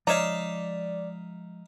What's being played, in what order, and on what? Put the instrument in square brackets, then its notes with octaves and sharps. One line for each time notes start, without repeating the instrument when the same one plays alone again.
[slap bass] F3 G#3 [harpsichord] D#4 E5 F5 [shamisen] C#5 A#5 [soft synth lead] D5